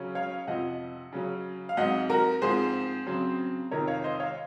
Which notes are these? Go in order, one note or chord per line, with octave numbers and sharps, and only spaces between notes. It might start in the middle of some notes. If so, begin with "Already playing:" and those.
Already playing: C#3 F#3 C#4
C#5 F5
F2 C3 F3 D#5 F#5
C#3 F#3 C#4
F5
G#2 F#3 C4 D#5 F#5
F#4 A#4
G#2 F3 C4 G#4 C5
C#3 F#3 C4
F2 C3 D#3 A#4 C#5
C#5 F5
C5 D#5
C#5 F5